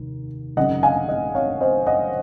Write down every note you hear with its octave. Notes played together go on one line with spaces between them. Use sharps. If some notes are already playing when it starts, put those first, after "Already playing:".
Already playing: F1 D#2
G#1 F#2 C#3 D#5 F#5
F5 G#5
D#5 F#5
C#5 F5
C5 D#5
D#5 F#5